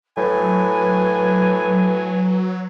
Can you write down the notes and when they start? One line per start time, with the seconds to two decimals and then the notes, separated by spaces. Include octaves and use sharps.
0.17 A2 F#3 B4 G#5